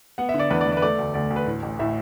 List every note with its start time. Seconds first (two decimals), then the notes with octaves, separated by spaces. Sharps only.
0.18 B3 F#5
0.29 E5
0.34 D3
0.40 D5
0.50 E2 B4
0.61 D5
0.66 E2
0.72 D5
0.77 B4
0.82 A3 D5
0.98 D2
1.14 D2 D5
1.30 D2
1.36 B4
1.46 A2
1.62 A1
1.79 A2 E5